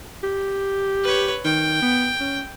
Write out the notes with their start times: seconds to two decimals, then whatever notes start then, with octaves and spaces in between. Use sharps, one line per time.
0.23 G4
1.04 B4 C#5
1.45 D#3 G5
1.82 B3
2.20 C#4